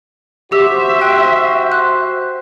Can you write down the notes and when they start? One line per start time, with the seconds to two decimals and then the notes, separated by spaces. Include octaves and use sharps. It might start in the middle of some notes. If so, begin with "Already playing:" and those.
0.52 F#4 G4 C5 E5 E6
1.01 G5 F#6
1.72 F#6